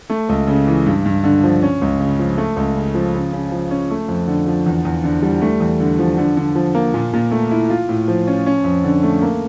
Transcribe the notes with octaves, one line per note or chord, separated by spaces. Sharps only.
A3
C#2
C#3
E3
G2
G2
D3
F3
C#4
C#2
C#3
F3
A3
C#2
C#3
F3
C#3
C#3
F3
C#4
A3
F2
D3
F3
E2
E2
D3
G3
A3
E2
D3
F3
D3
D3
F3
A#3
A#2
A#2
A3
E4
F4
A2
F3
C#4
C#4
F2
D3
A3
A#3